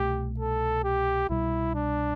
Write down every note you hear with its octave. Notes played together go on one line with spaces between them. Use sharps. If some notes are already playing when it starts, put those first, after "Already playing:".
Already playing: C2 B2 A3 G4
A4
G4
C2 B2 G3 E4
D4